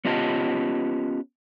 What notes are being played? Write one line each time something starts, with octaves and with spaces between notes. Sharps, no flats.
B3 C#4 F4 G4 D#5 A5